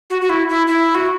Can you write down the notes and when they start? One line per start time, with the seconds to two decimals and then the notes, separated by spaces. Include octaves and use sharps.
0.10 F#4
0.22 F#4
0.29 E4
0.49 E4
0.67 E4
0.95 F#4